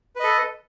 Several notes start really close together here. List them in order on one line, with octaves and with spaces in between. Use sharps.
B4 D#5 A4